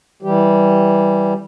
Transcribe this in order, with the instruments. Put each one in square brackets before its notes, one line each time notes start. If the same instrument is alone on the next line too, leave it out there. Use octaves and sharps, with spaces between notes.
[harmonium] E3 G3 G4